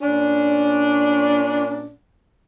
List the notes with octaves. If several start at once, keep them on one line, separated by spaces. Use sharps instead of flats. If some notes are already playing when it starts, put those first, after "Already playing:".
A#2 C#4 D4